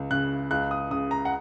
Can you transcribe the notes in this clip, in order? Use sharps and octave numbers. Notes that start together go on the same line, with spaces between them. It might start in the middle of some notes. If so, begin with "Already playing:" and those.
Already playing: C#2
C#3 F#6
C#2 F#6
D#6
C#3 D#6
A#5
F#5